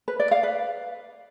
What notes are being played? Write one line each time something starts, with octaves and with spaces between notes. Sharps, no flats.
B4
D5
F5
B4